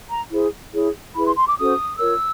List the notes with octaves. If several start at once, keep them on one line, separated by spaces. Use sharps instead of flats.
A#5
E4 G#4 C5
E4 G#4 C#5
E4 G#4 B4 B5
C6
C6
D6
C#4 F#4 A4 C5 D#6
F4 A#4 C#5 E6